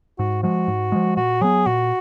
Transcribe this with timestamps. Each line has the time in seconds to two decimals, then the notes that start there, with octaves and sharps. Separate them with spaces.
0.18 G#2 F#4
0.43 F3 G#3 F#4
0.68 G#2
0.92 F3 G#3
1.16 A#2 F#4
1.41 F#3 B3 G#4
1.66 A#2 F#4